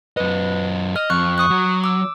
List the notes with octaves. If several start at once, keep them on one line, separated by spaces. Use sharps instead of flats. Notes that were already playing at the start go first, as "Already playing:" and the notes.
F#2 B4 D#5
D#5 F6
F2 C#6 F#6
C#6 D#6 F#6
F#3
D6 E6